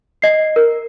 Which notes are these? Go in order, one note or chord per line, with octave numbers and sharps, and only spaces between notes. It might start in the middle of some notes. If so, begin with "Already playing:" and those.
D#5 C7
A#4